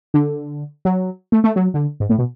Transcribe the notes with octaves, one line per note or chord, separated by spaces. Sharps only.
D3
F#3
A3
A3
F#3
D3
G#2
A2
B2